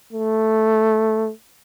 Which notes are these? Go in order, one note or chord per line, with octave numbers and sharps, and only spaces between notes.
A3